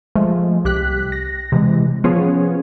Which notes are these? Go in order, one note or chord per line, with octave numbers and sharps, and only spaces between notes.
F3 G#3 A3 F4
C2 G4 F#6 B6
A#6
C3 E3 G#3
F3 B3 C#4 F4 G#4 C#5